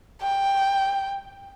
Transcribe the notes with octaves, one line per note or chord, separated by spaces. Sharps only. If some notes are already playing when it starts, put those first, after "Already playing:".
G5